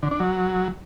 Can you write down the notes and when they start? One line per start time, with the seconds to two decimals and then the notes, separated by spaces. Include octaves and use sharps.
0.03 D3
0.11 D4
0.20 F#3